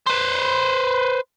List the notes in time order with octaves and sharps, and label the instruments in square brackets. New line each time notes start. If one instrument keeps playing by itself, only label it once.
[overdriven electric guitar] B4 C5